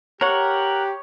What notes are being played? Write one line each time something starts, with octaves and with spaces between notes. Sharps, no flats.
G4 A#4 C#5 F#5